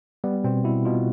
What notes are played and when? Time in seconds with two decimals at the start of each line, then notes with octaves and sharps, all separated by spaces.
0.24 G3 B3
0.44 B2 C4
0.64 B2 E4
0.85 B2 F4